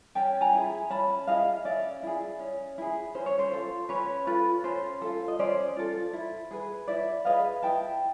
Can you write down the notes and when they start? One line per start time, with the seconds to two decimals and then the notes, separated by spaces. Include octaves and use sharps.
0.15 C#4 G5 A5
0.41 G#5 A#5
0.53 E4 G#4
0.90 C#4 A5 B5
1.27 E4 G#4 D#5 F5
1.65 C#4 D5 E5
2.03 E4 G#4
2.40 C#4
2.78 E4 G#4
3.15 C#4 C5
3.26 C#5
3.39 C5
3.52 F4 A4
3.89 C#4 B4 C#5
4.27 F4 A4 B4
4.64 C#4 C5
5.02 F4 A4
5.28 D#5
5.39 C#4 C5 D5
5.76 F4 A4
6.13 E4
6.51 G#4 B4
6.88 E4 D5 E5
7.25 G#4 B4 D#5 F5
7.63 E4 G5 A5